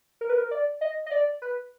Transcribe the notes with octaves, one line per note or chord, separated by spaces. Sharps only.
A#4
B4
A#4
D5
D#5
D#5
D5
B4